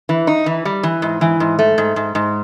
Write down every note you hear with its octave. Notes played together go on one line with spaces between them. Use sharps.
E3
D#4
E3
G3
E3
G#2
E3
G#2
A3
G#2
G#2
G#2